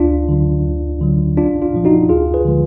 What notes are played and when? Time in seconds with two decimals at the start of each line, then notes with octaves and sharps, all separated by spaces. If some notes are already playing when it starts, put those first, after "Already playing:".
Already playing: D2 D4 F4
0.29 D3 F#3
0.65 D2
1.01 D3 F#3
1.37 B1 D4 F4
1.62 D4 F4
1.73 A#2 F3
1.85 D#4 F#4
2.09 D2 F4 G#4
2.34 G#4 B4
2.45 D3 F3 G#3